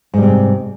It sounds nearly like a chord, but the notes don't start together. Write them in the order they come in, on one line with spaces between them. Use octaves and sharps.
G#2 G3 C3